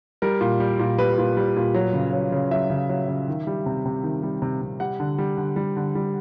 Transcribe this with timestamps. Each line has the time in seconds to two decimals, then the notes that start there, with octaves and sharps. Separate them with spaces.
0.22 G3 A#4
0.41 A#2
0.60 G3
0.79 A#2
0.98 G3 B4
1.18 A#2
1.37 G3
1.56 A#2
1.74 F#3
1.94 C#3
2.13 F#3
2.32 C#3
2.51 F#3 E5
2.70 C#3
2.89 F#3
3.08 C#3
3.28 D#3
3.47 G3
3.66 C3
3.86 C3
4.03 D#3
4.23 G3
4.42 C3
4.62 C3
4.80 G3 F#5
5.00 D3
5.18 G3
5.38 D3
5.56 G3
5.76 D3
5.95 G3